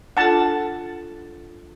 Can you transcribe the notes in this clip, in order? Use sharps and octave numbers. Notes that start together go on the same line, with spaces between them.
D4 F4 A4 F#5 A5